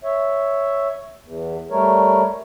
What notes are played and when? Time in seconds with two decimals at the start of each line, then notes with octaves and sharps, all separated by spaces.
0.04 C#5 E5
1.23 E2
1.70 G3 A3 A#4 C#5